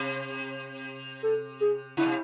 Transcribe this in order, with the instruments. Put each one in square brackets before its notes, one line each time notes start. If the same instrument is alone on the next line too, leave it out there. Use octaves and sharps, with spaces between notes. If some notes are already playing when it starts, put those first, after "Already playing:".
Already playing: [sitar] C3
[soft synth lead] A4
G#4
[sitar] C#3 [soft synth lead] E4
[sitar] C3